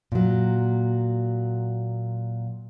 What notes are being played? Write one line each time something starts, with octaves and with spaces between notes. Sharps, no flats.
A#2 F#3